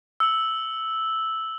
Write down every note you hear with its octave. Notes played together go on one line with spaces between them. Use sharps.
E6 F#7